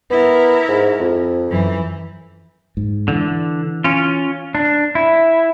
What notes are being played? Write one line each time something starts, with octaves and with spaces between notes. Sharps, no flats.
B3 E4 A#4
G#2
F2
F#2 E3
G#2
D3 E3
C#4 F4
D4
E4